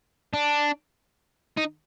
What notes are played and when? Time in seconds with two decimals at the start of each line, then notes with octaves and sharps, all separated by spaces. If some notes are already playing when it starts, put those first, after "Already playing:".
0.34 D4
1.57 D#4